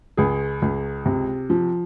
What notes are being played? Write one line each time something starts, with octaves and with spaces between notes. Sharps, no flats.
C#2 G#4
C#2
C3
F3